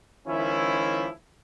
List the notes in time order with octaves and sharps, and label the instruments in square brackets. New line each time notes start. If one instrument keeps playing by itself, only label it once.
[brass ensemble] C#2 D#3 F3 C#4 E4